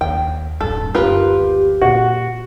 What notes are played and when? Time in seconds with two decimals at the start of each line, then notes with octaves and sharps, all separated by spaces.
0.01 D#2 G5
0.61 D1 G2 A4
0.95 F#1 D2 F4 G4 A#4 B4
1.81 A#2 F#4